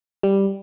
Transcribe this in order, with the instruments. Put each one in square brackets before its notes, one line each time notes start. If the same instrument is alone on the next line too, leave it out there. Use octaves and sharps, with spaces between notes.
[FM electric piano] G3